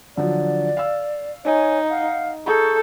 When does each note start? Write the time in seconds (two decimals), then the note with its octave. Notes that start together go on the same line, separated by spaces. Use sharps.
0.17 D3 F3 F#3 D5
0.77 F5 E6
1.45 D#4 C#5 G#5
1.89 F5 F#5
2.46 G#4 A4 A#5 C#6 G6